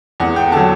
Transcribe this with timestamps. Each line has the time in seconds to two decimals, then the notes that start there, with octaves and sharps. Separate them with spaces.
0.20 E2 F#5
0.36 G5
0.52 D3 F#3 A5